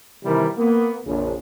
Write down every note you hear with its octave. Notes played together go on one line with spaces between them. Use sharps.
C3 D#3 E3 G3 E4 A#4
A#3 B3
A#1 F2 C#3